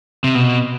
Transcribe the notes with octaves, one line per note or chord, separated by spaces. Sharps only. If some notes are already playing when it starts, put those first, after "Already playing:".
C3
B2